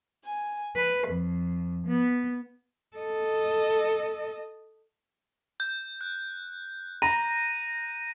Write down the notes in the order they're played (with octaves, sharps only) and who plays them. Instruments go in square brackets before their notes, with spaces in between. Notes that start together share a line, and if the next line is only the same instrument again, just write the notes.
[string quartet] G#5
B4
F2
B3
[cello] A4 D#5
[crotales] G6
F#6
[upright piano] A#5 [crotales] A#6 D#7